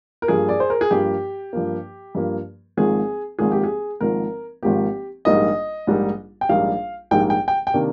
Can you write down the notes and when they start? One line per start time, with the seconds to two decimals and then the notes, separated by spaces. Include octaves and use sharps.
0.22 A#4
0.28 G2 F3 A#3 G#4
0.49 D5
0.60 C5
0.70 A#4
0.81 G#4
0.91 G2 F3 A#3 G4
1.53 G2 F3 A#3
2.15 G2 F3 A#3
2.77 G#1 G#2 F3 A#3 G#4
3.39 G#1 G#2 F3 A#3 G#4
3.52 G4
3.64 G#4
4.00 G#1 G#2 F3 A#3 A#4
4.63 G#1 G#2 F3 A#3 G4
5.25 A#1 G#2 G3 A#3 D#4 D#5
5.87 A#1 G#2 G3 A#3 D#4
6.41 G5
6.49 A#1 G#2 G3 A#3 D#4 F5
7.11 A#1 G#2 G3 A#3 D#4 G5
7.30 G5
7.48 G5
7.67 G5
7.74 C3 D#3 A#3 D4